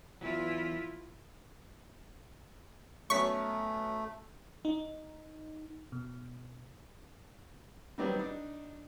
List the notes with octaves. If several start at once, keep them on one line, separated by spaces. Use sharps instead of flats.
E2 E3 F#3 E4 F4
F#3 A3 B3 C#4 C#6 B6
D#4
B2
D#3 F#3 G3 B3 C4 D5
D4 D#4